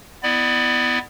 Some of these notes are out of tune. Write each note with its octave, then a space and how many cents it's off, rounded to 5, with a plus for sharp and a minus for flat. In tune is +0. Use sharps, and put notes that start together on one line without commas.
B3 +15 E4 +0 D5 +30